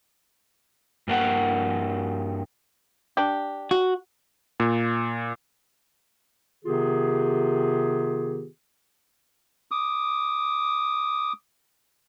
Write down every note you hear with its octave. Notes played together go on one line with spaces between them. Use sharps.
G2 A#3 F#5
D4 G4
F#4
A#2
C3 D#3 B3 F4 G4 G#4
D6 D#6